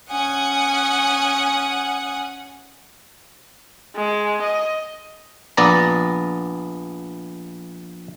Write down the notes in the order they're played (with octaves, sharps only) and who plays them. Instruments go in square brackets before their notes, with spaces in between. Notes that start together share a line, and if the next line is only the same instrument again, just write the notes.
[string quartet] C#4 F#5 G#5 D#6
[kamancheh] G#3
D#5
[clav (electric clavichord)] A#1 B3 D5 A#5